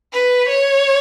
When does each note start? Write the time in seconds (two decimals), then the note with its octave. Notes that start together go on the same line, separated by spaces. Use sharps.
0.13 B4
0.49 C#5